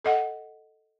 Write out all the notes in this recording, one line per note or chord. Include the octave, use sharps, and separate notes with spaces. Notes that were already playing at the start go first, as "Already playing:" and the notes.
A4 D#5 F#5